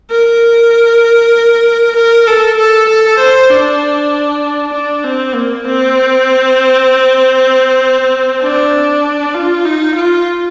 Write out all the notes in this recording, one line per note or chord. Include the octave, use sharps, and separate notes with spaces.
A#4
A#4
A4
A4
A4
C5
D4
D4
C4
A#3
C4
D4
F4
D#4
F4